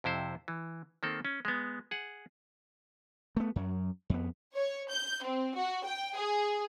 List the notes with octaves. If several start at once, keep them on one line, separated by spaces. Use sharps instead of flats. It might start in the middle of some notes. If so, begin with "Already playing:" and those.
F2 C3 E4 C5
E3
D#3 A#3 C4 A4
C#4
G#3 B3
G#4 F#5
A3 B3
F#2 F#3
F2 B3
C#5
G6
C4
F#4
G5
G#4